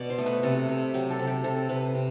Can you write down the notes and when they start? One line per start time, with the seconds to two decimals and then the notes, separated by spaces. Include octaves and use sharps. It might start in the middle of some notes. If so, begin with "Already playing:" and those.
Already playing: B2 D5
0.10 C5
0.18 A3
0.26 B4
0.43 C3 A4
0.69 C3
0.94 F#3 G4
1.11 A4
1.19 C3
1.27 G4
1.44 C3 A4
1.69 C3 B4
1.95 C3